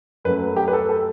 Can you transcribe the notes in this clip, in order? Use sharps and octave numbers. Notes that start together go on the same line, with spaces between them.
F#2 F#3 A3 B4
G4
B4
A4
A4